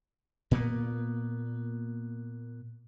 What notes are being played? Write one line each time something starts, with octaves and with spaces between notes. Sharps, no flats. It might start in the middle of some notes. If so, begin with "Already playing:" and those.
A#2 A#3 B3